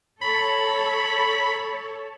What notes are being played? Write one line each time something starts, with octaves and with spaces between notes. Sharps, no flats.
A4 C#5 B5